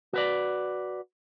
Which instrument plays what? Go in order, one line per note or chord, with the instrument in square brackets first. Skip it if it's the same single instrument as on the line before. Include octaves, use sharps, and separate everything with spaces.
[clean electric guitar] F#4 B4 D5